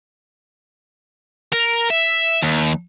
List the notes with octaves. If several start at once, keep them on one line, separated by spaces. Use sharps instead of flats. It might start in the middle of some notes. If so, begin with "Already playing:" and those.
A#4
E5
D#2